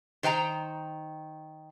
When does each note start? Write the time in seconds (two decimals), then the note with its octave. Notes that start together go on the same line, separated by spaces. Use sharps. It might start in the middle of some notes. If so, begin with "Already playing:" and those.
0.23 D#3 C5 G5 A#5